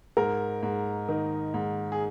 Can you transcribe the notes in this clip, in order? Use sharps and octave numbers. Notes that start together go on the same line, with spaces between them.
G#2 A#4
G#2
D#3
G#2
G#4